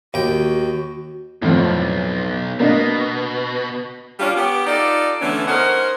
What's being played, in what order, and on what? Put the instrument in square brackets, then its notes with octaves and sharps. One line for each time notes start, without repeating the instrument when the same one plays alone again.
[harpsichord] D#2 G5 [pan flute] F#4
[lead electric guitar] B1 [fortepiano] F2 A2
[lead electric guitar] B2 [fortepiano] A#3 D4 D#5
[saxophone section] G3 C#4 D4 F4 G4
B3 G4
D#4 F4 A4 D5
D3 E3 A3 B3 C#4
C#4 D#4 A#4 C5 F#5